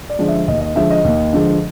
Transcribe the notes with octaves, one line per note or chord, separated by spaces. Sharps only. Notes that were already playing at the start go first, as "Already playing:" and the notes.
D5
D3 F3 G#3
E5
D#2 D#5
D#5
D3 F3 G#3 E5
D#5
D#2
D3 F3 G#3